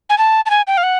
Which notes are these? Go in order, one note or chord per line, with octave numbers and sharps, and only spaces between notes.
G#5
A5
A5
G#5
G5
F5
F#5